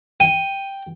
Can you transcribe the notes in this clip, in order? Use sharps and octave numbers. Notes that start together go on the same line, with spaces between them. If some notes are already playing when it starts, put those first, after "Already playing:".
G5 D#7